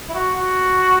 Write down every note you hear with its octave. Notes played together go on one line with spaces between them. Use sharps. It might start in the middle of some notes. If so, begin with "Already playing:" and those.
E4
F#4
F#4